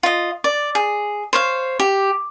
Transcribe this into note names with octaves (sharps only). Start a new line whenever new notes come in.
F4 D#5
D5
G#4
C5 C#5 F5
G4